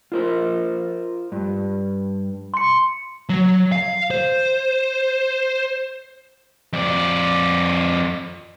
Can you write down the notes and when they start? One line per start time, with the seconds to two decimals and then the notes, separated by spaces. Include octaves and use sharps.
0.12 F4 A#4 C5
1.32 G2
2.54 C6 C#7
3.29 F#3
3.72 F5
4.11 C5
6.73 F2 D5